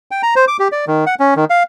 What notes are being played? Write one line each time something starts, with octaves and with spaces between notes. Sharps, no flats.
G5
A#5
C5
D6
G4
D5
D#3
F#5
C#4
D#3
F5